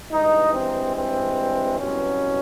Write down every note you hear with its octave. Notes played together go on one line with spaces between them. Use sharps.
G2 E3 G#3 D#4
C4
C4
C2 B2 F#3 B3 C#4